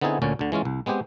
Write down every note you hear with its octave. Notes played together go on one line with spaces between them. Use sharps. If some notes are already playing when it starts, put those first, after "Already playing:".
D3 B3 C4 D#4 E4 G#4
D2 A#2 D3 C#4
D2 D3
E3 G#3 C#4 F4
C2
G#3 B3 C4 G4 C5